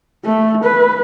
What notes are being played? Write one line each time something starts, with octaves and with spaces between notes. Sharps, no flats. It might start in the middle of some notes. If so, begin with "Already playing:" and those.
A3
B4